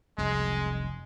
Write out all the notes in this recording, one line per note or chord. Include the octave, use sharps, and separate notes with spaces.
F1 C2 F#2 G#3